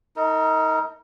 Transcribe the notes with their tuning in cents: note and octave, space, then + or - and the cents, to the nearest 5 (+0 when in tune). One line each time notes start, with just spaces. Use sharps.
D#4 +25 A#4 -35